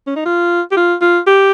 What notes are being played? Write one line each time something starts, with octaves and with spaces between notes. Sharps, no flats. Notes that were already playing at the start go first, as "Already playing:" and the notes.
C#4
D#4
F4
G4
F4
F4
G4